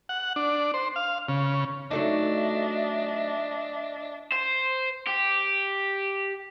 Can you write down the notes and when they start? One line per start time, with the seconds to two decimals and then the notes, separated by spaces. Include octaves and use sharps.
0.09 F#5
0.36 D4
0.74 C5
0.96 F5
1.29 C#3
1.91 F#3 A3 D4 D#4 D#5 E5
4.32 C5
5.07 G4